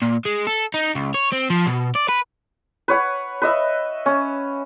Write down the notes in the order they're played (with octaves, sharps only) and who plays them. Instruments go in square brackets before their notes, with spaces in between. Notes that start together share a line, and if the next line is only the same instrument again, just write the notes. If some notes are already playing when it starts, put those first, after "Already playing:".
[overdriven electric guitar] A#2
G#3
A4
D#4
C#2
C#5
C4
F3
B2
D5
B4
[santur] B4 C#5 F#5
B4 D#5 E5
C#4